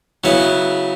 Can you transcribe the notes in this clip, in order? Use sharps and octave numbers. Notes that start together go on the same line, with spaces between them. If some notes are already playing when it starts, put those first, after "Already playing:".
C#3 F#3 B3 E4 B4